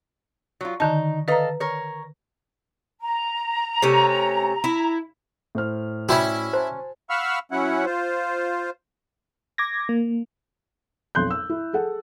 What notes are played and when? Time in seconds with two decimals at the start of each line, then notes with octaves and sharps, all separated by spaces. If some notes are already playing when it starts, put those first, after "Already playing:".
0.61 F#3 F4
0.80 D3 D#3 D#4 A5
1.28 A4 B4 D#5 F5 A#5
1.60 A#4 C#5
3.00 A#5
3.82 C3 A3 C#4
4.64 E4
5.55 A2 C5 F6
6.09 G3 C#4 E4 F#4 B5
6.53 C5 G#5 A5 C6
7.10 F5 F#5 B5 C#6 E6 F6
7.52 F#3 C#4 E4 F#5
7.85 F4 C5
9.58 D6 G#6 A#6
9.89 A#3
11.15 B1 F2 C6 F#6 G6
11.30 E6
11.50 E4
11.73 G#4 A4 F#5